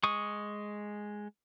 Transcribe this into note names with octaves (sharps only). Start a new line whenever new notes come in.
G#3 C#6 D#6